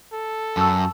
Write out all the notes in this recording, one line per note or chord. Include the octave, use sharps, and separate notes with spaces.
A4
F#2 A5 E6